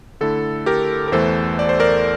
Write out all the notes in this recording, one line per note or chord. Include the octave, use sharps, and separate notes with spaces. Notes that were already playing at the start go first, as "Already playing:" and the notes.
D3 A3 E4 A4
G4 A#4
A#4
E2 E3 A3 A4 C5
D5
C5
A#4 D5